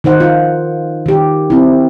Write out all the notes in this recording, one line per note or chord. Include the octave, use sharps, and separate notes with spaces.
D#3 D#4 C5 F#5
F4
D#3 G4
C4 E4